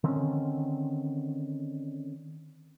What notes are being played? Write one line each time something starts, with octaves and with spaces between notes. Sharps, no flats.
D3 D#3 C4 C#4